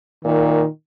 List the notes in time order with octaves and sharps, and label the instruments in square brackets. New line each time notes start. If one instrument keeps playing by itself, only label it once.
[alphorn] A#2 [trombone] D#3